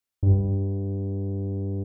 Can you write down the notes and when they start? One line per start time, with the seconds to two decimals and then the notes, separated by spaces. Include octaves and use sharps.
0.23 G2